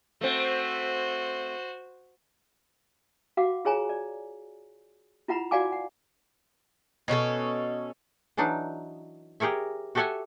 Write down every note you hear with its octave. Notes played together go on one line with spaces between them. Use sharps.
A3 C4 F#4 C5
F#4 F5 F#5 D6
F4 G#4 C#5 G#5 A#5
D5
E4 F4 F#5 A#5 B5
F#4 D5 F5 F#5 G#5 D6
F#5
B2 C#4 E4 A4
E3 F#3 D4 D#4
G4 G#4 A#4 C#5 E5
F#4 G4 A4 E5 F#5 G#5